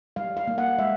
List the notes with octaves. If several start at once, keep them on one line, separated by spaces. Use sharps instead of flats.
G3 F5
F5
A#3
F#5
G#3 E5